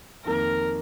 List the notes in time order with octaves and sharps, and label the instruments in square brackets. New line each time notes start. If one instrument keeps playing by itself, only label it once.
[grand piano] F2 D#3 A#3 [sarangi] A#4